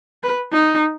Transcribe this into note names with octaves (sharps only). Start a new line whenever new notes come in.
B4
D#4